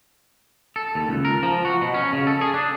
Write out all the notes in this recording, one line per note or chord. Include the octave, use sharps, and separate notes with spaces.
A4
D#2
C#2
A#4
F3
F#4
B2
C#4
C#3
A4
G#4
D4